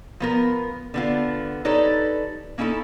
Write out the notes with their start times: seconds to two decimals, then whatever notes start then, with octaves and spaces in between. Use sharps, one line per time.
0.20 F3 B3 A#4
0.94 D3 B3 F4
1.65 D#4 G4 A4 B4 C#5 D5
2.58 A#3 C#4 D#4 E4 A4